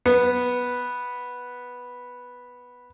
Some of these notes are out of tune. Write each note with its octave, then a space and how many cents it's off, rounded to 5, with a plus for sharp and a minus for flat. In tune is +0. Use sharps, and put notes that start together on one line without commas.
B3 -5